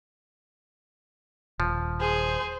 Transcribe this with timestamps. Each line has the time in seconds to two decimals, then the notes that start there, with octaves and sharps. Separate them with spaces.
1.60 D#1 F3
2.00 G#4 C5